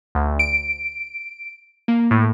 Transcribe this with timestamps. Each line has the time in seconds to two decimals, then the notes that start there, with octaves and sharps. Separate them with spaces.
0.15 D2
0.39 D7
1.88 A#3
2.11 A2